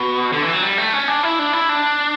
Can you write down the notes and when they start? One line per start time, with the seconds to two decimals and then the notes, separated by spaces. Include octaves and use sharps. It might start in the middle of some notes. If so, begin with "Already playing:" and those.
Already playing: B2
0.32 D3
0.43 E3
0.53 F#3
0.62 G3
0.78 A3
0.93 C#4
1.08 D4
1.23 E4
1.39 D4
1.53 E4
1.69 D4